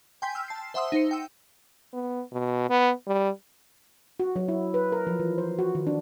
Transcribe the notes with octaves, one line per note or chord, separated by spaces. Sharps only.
G5 G#5 C6 G6 B6
E6 F6
A5 C7
C5 E5 F#5 C6 D#6 E6
D#4 C5 C#7
G5 E6
B3
B2
B3
G3
F#4
F#3
E4
B4
A#4
F3
E3
C5
F#4
D#3
D4